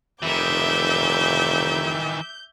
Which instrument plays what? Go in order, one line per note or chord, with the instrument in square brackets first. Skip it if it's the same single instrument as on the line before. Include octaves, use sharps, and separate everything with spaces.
[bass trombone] F1 [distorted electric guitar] D#3 E3 [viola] E5 D6 [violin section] G6